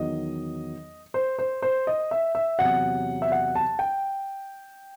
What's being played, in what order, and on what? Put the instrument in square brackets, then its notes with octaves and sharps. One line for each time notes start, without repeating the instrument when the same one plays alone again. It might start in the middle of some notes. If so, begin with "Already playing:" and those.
Already playing: [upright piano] E2 D#3 F#3 D#5
C5
C5
C5
D#5
E5
E5
E2 C3 F#3 F#5
E5
F#5
A5
G5